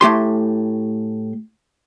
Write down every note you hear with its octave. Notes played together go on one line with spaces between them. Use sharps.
A2 A3 G4 C6